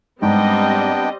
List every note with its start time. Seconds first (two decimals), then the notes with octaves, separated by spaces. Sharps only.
0.22 G#2 G3 B3 C4 D4 D#5 G5